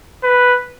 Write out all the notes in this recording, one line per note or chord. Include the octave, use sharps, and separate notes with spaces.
B4